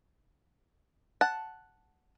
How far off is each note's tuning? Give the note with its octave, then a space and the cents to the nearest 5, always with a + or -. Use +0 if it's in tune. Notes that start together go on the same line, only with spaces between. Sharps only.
F#5 +0 A5 +0